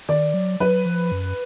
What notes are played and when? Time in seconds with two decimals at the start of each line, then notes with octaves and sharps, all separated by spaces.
0.09 D#3 D5
0.34 F#3
0.60 F#3 B4
0.85 F3
1.12 F#2